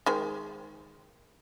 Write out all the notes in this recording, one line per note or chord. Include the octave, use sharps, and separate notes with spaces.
D#3 G#3 C5